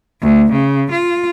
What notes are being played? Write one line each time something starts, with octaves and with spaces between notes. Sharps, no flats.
D2
C#3
F4